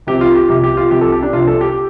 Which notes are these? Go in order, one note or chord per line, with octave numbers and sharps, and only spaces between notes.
C2 C3 F3 G4
F4
G4
C2 C3 F3 G4
G4
F4
C2 C3 F3 G4
A4
G4
D4
C2 C3 F3 F4
A4
G4